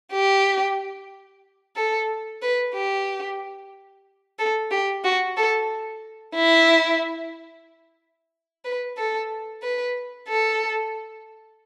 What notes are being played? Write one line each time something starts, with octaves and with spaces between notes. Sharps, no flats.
G4
A4
B4
G4
A4
G4
F#4
A4
E4
B4
A4
B4
A4